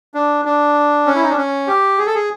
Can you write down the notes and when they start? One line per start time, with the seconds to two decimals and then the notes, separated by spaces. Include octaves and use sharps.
0.14 D4
0.45 D4
1.06 C#4
1.15 E4
1.23 D#4
1.30 D4
1.36 C#4
1.67 G4
1.98 G#4
2.06 A4
2.15 G#4